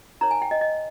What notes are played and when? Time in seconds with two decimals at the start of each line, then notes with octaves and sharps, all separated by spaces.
0.21 D#4 A#4 C#5 A#5
0.31 G#5
0.42 G5
0.51 D#5
0.61 D#5